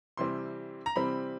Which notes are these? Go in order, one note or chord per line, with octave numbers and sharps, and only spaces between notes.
C3 E3 G3 C4 C6
A#5
C3 E3 G3 C4 B5